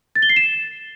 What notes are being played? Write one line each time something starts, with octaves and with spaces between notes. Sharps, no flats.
A6
G7
C7
E7